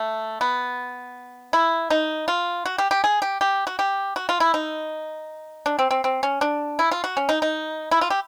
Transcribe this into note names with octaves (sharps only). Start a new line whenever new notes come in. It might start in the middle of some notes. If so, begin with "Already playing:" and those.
Already playing: A3
B3
E4
D#4
F4
F#4
G4
G4
G#4
G4
G4
F#4
G4
F#4
F4
E4
D#4
D4
C4
C4
C4
C#4
D4
E4
F4
F#4
C#4
D#4
D#4
E4
F4
G4